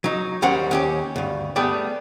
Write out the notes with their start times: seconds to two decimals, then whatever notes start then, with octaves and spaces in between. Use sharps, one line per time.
0.04 F#3 D#4
0.42 D#2 G3 A#3 C#4 C5 F#5
0.71 D#2 C#4 G4
1.16 D2 G2
1.56 G3 A3 B3 G4 G#4 D5